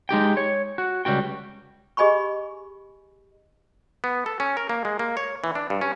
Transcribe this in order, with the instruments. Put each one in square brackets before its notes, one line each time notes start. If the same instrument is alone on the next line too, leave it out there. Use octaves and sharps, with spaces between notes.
[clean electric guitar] G#3 D#4 G4 G5
C#5
F#4
C#2 G3 F#4 G5
[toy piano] G4 G#4 D#5 G#5 B5 C#6
[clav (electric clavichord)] B3
A4
C#4
A#4
A#3
G#3
A#3
C#5
E3
D4
G2
C#4